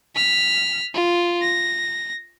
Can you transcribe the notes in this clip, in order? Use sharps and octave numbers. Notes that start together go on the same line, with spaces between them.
F6 B6
F4
A#6